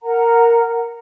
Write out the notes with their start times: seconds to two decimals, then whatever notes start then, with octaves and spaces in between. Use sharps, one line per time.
0.02 A#4 F#5 A#5